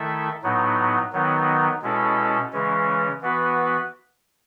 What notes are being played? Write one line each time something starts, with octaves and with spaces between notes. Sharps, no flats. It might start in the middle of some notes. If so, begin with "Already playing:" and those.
Already playing: D#3 A3 E4 A4 E5
A2 F#3 B3 D#4
D#3 F#3 B3 D#4
B2 G#3 C#4 E4 A4
C#3 E3 G#3 C#4
E3 B3 F#4 B4